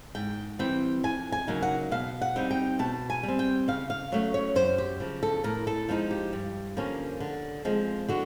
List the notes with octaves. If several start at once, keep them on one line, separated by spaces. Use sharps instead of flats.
G#2 G5
E3 G3 C4 G5
F2 G#5
G#5
C#3 F#3 A#3 D#4
F#5
B2 F5
F#5
G3 C4 D#4
G5
B2 A5
G#5
G3
C4
G5
C#3 F5
F5
F#3 A3 C#4 C#5
C#5
F#2 C5
G4
C#3 F3
A4
A2 A#4
A4
F3 G#3 C4 D#4
G4
G2
D3 F3 A#3 C#4
D3
F3 G#3 C4
D3 F#4